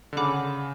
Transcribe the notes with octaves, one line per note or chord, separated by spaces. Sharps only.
D3
C#3 F#5 B5 D6